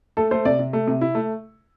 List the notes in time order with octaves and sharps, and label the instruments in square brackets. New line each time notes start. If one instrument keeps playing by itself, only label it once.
[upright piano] A3 [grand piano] A4
[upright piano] A3 [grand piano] C5
[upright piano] C3 [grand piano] D5
[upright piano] C3
A3
C3
E4
A3